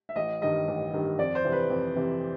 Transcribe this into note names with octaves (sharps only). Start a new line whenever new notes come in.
E5
A1 D#5
G2 D#3 G3 D#5
A1
G2 D#3 G3
F2 D5
C5
C3 E3
B4
F2
C3 E3